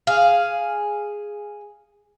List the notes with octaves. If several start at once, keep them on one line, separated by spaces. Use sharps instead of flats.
G#4 F5